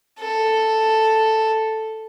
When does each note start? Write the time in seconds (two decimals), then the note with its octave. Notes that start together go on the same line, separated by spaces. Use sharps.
0.20 A4